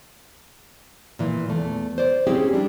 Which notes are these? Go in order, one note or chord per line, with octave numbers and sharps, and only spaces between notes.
A#2 E3
E2 A3
C5 D5
C4 C#4 E4 G4 G#4
G3 D4